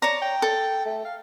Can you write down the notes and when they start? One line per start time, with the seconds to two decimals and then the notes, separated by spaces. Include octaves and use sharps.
0.02 C#5 D5 A5 A#5
0.22 G5
0.42 A4
0.86 A3
1.05 F5